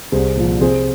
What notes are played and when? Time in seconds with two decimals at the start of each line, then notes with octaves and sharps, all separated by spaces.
0.12 C2 G#4 C5
0.36 A#2 F3
0.61 C3 G#4 C5